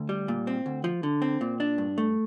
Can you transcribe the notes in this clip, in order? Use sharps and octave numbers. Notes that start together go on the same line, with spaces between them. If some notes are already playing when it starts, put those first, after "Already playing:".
Already playing: D2
G3
A#2
C4
D2
F3
D3
C4
A#2
D4
G2
A3